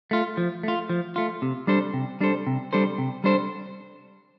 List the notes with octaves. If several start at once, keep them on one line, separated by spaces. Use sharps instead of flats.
A3 F4
F3
A3 F4
F3
A3 F4
C3
G3 D4 A4 C5
C3
G3 D4 A4 C5
C3
G3 D4 A4 C5
C3
G3 D4 A4 C5